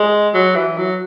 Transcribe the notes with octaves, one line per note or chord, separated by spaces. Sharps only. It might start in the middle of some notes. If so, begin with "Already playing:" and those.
Already playing: G#3
F#3
E3
F#3